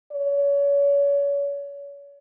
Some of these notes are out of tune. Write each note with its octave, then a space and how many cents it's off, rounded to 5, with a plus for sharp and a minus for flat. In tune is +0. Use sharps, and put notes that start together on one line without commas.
C#5 +35